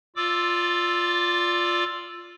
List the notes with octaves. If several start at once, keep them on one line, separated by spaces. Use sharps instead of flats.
F4 D5 D6 E6